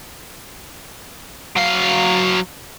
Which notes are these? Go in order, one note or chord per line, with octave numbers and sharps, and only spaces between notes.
F#3 F5